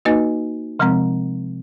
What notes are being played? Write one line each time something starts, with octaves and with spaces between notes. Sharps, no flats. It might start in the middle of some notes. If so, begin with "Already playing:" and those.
A#3 D#4 F#4 B4 D#5
C3 F3 G#3 C4